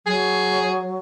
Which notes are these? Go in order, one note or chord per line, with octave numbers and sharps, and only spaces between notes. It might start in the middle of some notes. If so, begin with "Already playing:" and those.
F#3 G#4